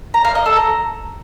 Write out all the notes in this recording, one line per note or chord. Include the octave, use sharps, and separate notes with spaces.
A#5
F5
D#5
A4
A#5